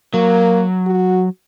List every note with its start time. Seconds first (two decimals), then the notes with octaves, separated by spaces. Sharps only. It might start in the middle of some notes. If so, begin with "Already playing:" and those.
0.14 F#3 A#3
0.87 F#4